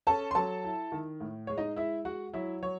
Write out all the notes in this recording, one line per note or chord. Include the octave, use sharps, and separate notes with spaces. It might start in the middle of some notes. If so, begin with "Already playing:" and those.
C#4 A4 A5
C6
F#3 A4 A5
E4
D#3
A2
G#3 C#5
D#4 D#5
G#3 E4 E5
G#3 F#4 F#5
F#3 E4 E5
F#3 C#5